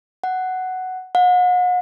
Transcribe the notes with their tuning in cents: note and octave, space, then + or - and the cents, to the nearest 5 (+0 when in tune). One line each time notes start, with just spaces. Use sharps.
F#5 +5
F#5 -40